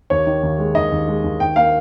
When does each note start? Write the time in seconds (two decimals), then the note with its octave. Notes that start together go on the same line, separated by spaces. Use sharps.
0.10 D#2 C#5
0.26 D#3
0.43 D#2
0.59 G#3
0.75 D#2 D#5
0.92 D#2
1.08 G#3
1.24 D#2
1.40 D#2 G5
1.56 A#3 F5